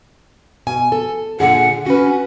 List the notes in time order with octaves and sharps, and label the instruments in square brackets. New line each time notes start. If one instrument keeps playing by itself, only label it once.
[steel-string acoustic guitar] B2 G#5
A4
[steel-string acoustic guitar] A#2 D3 G#4 [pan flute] F#5
[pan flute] C#4 [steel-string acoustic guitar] F#4 B4